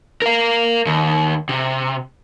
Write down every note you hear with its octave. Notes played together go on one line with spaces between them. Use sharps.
A#4 F5
D#2
C3